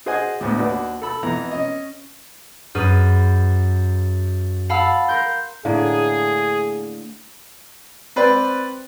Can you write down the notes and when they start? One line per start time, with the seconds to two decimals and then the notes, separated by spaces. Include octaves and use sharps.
0.06 F#4 G#4 C5 D#5 F#5 G#5
0.41 D2 A2 B3
0.57 D#2 D4 F#4 B4 D6
1.02 A4 B5 E6
1.23 F2 E3 B3 A#5
1.51 C#4 D#5
2.75 F#2 G#4 B4 F6
4.69 F5 F#5 A5 B5 E6
5.08 A#4 C6 G6
5.65 A2 D3 A#3 G#4
8.16 C4 B4 D5